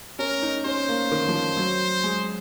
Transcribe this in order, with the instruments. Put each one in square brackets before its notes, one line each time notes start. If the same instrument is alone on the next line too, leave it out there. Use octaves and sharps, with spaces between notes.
[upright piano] C#4 [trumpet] A#4
[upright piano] D#4
[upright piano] C#4 [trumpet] C5
[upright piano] A#3
D#3
F3
D#3
F#3
G#3